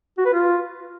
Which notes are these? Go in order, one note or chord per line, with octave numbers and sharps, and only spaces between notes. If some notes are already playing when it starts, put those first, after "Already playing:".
F#4
B4
F4